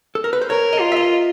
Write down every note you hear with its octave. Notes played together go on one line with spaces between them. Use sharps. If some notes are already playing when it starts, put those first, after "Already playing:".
A4
A#4
B4
C5
A#4 C#5
D#5
F4
E5
D#5